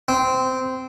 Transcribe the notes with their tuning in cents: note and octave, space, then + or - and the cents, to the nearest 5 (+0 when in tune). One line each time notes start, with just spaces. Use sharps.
C4 -15